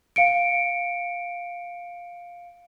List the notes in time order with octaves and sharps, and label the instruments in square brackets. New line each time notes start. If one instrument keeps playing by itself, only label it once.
[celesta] F5 C#7 D7